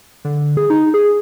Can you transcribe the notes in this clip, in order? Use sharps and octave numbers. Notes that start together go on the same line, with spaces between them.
D3
G#4
D#4
G#4